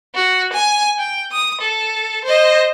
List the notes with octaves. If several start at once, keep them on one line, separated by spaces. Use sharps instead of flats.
F#4
G#5
G5
D#6
A4
C5 D#5